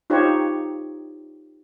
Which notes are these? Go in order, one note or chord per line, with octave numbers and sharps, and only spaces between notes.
D#4 F4 G4 C5 C#5